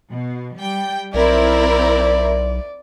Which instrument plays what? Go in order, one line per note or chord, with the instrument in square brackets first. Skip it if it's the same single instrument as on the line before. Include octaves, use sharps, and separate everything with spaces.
[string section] B2
G3 G5
[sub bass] B1 [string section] C4 E4 A#4 [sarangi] D5